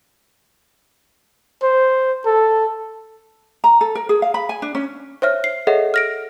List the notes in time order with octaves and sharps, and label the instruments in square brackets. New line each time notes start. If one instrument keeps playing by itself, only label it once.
[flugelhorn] C5
A4
[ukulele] A#5
A4
A#4
G#4
F5
B5
G#5
D4
C#4
[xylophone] C5 C#5 E5 F6
C7
G#4 A4 C#5 D#5 E5 F#5
F6 A#6 D7